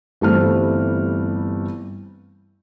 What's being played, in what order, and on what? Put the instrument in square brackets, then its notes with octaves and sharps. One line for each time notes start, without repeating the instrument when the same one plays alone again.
[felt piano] G1 E3 G3 A3 C4 F6